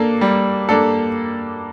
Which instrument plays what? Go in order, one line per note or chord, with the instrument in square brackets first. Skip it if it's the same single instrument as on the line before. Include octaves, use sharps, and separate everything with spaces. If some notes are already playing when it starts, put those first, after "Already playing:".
Already playing: [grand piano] A#3 D4 A4
G3
A#3 D4 A4